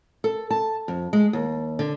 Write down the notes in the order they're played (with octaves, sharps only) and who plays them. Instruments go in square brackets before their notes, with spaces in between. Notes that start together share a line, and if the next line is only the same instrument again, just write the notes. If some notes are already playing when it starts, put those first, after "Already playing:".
[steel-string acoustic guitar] A4
A5
F2
G#3
D#2
D3